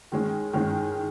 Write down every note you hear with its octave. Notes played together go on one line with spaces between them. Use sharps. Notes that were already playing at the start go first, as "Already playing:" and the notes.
D#3 G#3 C#4
D#3 G#3 C#4